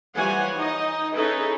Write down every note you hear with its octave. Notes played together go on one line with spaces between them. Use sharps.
E3 F3 G3 C#5 F#5 G#5
D#4 D#5
C#4 D#4 E4 G#4 A4 B4